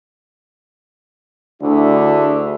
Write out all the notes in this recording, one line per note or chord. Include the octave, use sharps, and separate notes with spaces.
D2 D3 E4 G#4 E5